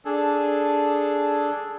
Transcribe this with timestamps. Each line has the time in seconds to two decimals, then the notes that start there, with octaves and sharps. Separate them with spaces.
0.05 D4 G#4 A4